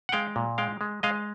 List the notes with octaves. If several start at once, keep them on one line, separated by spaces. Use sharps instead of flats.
F#5
G#3 F5 G5
A#2
G#3 F5 G5
G#3
G#3 D#5 F5